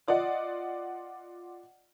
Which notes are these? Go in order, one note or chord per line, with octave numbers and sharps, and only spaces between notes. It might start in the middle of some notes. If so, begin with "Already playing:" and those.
F4 D5 D#5 F#5